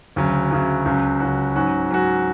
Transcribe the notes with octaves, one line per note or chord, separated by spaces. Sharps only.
D2 C#3 F#3
D2 C#3 F#3
C#2 C#3 F#3 C#4 F#4
C#2 C#3 F#3 C#4 F#4
G#2 F#3 C#4 F#4
G#2 F#3 C#4 F#4